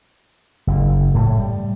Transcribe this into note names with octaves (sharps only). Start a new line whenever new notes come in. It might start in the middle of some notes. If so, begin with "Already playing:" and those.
F#1
A2
G3